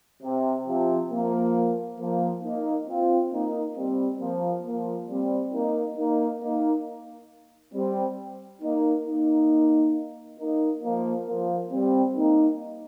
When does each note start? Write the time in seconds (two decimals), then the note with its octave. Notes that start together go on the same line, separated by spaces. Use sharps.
0.23 C3
0.66 C3 F3
1.10 F3 A#3
1.99 F3 A#3
2.43 A#3 D#4
2.87 C4 F4
3.32 A#3 D#4
3.76 G3 C4
4.20 F3 A#3
4.64 F3 A#3
5.08 G3 C4
5.53 A#3 D#4
5.96 A#3 D#4
6.41 A#3 D#4
7.74 G3 C4
8.62 A#3 D#4
9.06 A#3 D#4
10.39 A#3 D#4
10.83 F3 A#3
11.27 F3 A#3
11.71 G3 C4
12.16 A#3 D#4